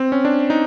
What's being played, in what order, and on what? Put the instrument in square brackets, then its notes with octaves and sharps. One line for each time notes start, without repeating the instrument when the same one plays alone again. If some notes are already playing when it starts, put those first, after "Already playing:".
Already playing: [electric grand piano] C4
C#4
D4
D#4